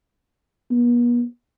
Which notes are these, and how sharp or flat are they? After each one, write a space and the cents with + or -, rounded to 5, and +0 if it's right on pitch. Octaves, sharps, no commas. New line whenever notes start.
B3 -40